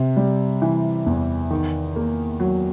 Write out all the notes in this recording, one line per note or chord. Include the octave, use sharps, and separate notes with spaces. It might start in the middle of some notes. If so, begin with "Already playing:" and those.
Already playing: C3
G3
E3
E2
D#3
A#3
F#3